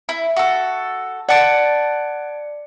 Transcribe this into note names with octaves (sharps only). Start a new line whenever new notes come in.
E4
F#4 A4
D5 F#5 A5 C#7 D7